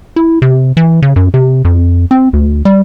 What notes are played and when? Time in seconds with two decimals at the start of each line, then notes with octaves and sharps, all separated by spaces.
0.16 E4
0.42 C3
0.77 E3
1.02 C#3
1.16 F#2
1.34 C3
1.65 F2
2.11 C4
2.33 D2
2.65 G3